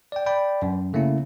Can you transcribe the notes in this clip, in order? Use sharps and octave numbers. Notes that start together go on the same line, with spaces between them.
D5 G5
D5 G5 B5
F#2
C#3 A3 A#3 C#4 E4